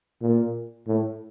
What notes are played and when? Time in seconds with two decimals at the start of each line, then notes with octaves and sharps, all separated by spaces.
0.22 A#2
0.87 A2